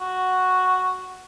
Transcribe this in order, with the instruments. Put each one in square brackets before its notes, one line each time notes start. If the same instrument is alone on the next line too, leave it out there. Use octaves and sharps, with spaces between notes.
[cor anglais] F#4